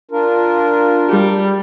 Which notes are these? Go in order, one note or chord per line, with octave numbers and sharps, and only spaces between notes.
D4 F4 A#4
G3